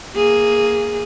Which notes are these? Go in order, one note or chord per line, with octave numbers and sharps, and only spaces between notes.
A#3 G#4